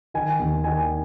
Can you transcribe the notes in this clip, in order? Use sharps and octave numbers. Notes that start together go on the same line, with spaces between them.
D#3 G#5
D#2
D#3 G#5